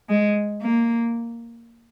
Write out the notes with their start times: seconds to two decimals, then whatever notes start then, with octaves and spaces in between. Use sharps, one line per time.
0.09 G#3
0.62 A#3